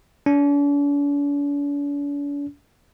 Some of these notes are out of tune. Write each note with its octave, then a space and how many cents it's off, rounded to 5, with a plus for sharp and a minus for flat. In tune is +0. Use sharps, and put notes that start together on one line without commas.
D4 -45